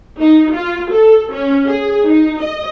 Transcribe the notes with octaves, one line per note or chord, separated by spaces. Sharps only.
D#4
F4
A4
C#4
G#4
D#4
D#5